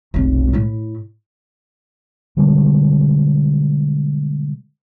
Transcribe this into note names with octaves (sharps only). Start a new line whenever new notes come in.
F1 B1
A2 E4
B2 D3 G3 G#3